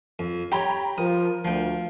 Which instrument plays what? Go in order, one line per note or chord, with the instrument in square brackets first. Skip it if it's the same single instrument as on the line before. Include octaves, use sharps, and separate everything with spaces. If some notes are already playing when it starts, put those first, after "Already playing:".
[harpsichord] F2
[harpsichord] G4 C#5 [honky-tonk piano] G5 A#5 B5
[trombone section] F3 [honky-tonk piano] A#4 [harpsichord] D#6
[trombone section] D2 [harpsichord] F3 G5